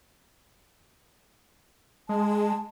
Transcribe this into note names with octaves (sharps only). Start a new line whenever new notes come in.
G#3 A5